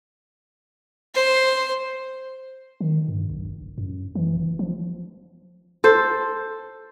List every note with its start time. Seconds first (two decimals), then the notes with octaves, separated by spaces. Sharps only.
1.14 C5
2.81 D#3
3.08 G2
3.30 B1
3.45 F#1
3.78 F#2
4.15 E3
4.36 F#1
4.59 F3
5.84 A4 C5